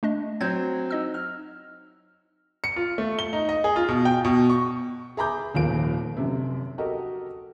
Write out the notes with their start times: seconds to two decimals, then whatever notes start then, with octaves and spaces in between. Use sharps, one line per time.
0.03 A3 D4 D#5
0.41 F#3 C4 G6 G#6
0.91 D#4 D#5 E6
1.14 F6
2.64 C#7
2.76 F4
2.98 A3
3.19 G7
3.33 D#4
3.49 D#5
3.64 G#4
3.76 F4
3.88 B2
4.05 G5
4.25 B2
4.50 C#6
5.17 G#4 E5 A#5 B5 D6 G6
5.54 D#1 G#1 D#2 F3 F5 D7
6.17 F1 F#2 C3
6.78 F#4 G4 A4 A#4 D#5